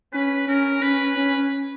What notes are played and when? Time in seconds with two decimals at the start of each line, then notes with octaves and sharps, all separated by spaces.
0.13 C#4 B4
0.48 C#4 A#4
0.82 C#4 B4
1.17 C#4